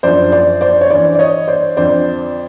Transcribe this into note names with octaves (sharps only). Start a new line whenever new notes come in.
F#2 D3 F3 C5 D5
C5 D5
C5 D5
C#5
G2 E3 C5 D5
D5
C#5 D#5
C5 D5
F2 D3 F3 C5 D5